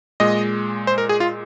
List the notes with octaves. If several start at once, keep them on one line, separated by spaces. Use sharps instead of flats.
A#2 G#3 D#5
C5
A#4
G#4
F4